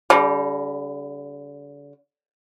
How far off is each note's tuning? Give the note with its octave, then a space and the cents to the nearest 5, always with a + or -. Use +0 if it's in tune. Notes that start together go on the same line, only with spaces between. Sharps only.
D3 -40 G3 +0